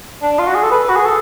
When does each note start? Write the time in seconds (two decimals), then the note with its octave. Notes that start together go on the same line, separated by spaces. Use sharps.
0.22 D4
0.39 F4
0.48 F#4
0.55 G#4
0.63 A4
0.72 B4
0.89 F#4
0.96 G#4
1.05 A4